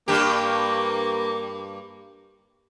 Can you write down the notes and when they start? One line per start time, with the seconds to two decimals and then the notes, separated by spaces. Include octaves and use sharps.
0.08 G2 A#3 G4